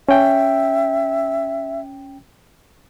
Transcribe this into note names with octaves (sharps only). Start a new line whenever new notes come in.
C#4 E5 G5